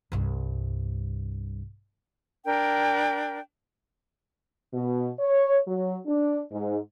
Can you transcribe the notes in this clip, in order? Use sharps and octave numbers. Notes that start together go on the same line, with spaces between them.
C2 G2
D4 A#4 G5
B2
C#5
F#3
D4
G#2